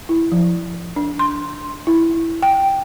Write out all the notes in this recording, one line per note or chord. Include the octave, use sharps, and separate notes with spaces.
E4
F3
D4
C6
E4
G5